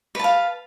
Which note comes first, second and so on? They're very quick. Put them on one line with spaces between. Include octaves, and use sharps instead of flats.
B4 A5 F5